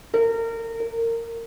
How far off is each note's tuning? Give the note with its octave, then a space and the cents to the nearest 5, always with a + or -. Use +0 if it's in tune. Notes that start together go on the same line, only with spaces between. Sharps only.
A#4 -30
A#4 -20